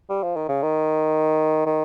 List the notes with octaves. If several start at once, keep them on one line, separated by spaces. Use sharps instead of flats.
G3
F3
D#3
C#3
D#3
D#3